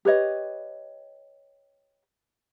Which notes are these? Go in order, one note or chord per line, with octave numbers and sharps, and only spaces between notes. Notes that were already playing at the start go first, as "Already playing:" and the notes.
G4 B4 C#5 D#5